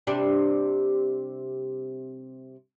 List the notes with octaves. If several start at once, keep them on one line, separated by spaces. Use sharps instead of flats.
C3 G3 D4